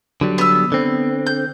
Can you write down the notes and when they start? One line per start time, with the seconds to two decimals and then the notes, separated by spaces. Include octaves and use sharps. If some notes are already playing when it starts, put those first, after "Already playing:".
0.21 D3 F#3 G3
0.38 B3 E6
0.72 D3 C4
1.27 G6